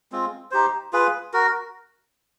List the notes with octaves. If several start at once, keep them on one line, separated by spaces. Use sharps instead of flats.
G#3 C4 F4
D#4 G4 C5
F4 G#4 B4
F#4 A#4